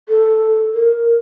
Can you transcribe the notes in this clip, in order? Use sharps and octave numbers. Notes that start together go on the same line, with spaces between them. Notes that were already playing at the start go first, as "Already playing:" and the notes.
A4
A#4